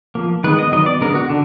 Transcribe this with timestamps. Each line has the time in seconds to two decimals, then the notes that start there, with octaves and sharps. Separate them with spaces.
0.15 F3 A#3
0.44 D#3 G#3 B3 B4
0.59 D#5
0.72 D#3 F#3 B3 D#5
0.86 D5
1.01 D3 G#3 B3 A#4
1.15 F#4
1.30 D3